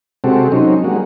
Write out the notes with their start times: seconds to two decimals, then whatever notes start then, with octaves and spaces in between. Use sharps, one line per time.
0.24 C3 G#3 C4 F#4 G4 A4
0.52 F#3 C4 C#4 D#4
0.84 G3 G#3 A#3 F#4